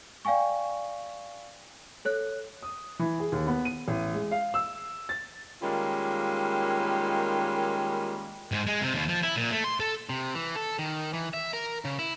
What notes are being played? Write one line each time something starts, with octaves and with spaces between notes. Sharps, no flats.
D5 F5 G5 G#5 C#6
A4 C#5 F#6
D#6
E3
G#4
D#2
B3
D#7
A1
G#3
F5
E6
A6
D#3 G3 G#3 A#3 C#4 F4
G#2
G#3
C3
D#2
F3
E4
A#2
A3
C6
A4
C3
E3
A4
D#3
E3
E5
A#4
C#3
E4